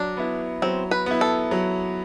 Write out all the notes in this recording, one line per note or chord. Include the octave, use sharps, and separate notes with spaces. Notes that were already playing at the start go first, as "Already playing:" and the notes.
Already playing: F#3 D4
B3 E4
F#3 C4
B4
B3 E4
A4
F#3